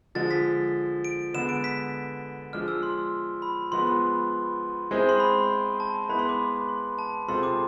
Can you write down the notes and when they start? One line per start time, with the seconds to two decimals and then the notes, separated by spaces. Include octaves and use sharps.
0.15 D3 F3 G#3 A6
0.31 B6
1.04 D7
1.34 D3 G#3 B3 E7
1.49 D7
1.64 B6
2.53 F3 G#3 D4 F6
2.68 E6
2.83 C6
3.42 B5
3.72 F3 G#3 B3 C6
4.91 G#3 C4 E4 G#4 C5
5.09 C6
5.20 B5
5.80 A5
6.09 G#3 B3 E4 B4 B5
6.19 C6
6.29 D6
6.39 C6
6.69 C6
6.99 A5
7.28 C3 G#3 C4 F4 A4 C6
7.43 D6